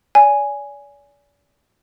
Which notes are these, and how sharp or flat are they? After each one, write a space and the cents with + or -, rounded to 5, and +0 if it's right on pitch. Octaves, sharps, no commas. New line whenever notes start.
D5 -40 G#5 +0